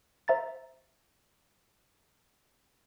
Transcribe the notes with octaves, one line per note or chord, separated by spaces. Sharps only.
C5 E5 A#5 A6